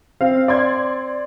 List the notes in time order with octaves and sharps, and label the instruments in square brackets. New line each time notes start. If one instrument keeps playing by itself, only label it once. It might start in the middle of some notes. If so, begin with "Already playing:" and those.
[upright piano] C4 [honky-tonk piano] F5
[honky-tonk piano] D5 C6 G#6